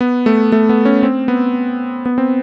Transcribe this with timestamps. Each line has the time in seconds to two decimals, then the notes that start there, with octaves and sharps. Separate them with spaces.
0.01 B3
0.26 A3
0.52 A3
0.69 B3
0.85 C#4
1.03 C4
1.28 B3
2.06 B3
2.18 C4